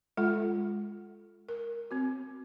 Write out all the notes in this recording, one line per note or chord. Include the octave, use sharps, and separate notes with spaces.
G#3 F4 A4 F#5
A#4
C4 F#4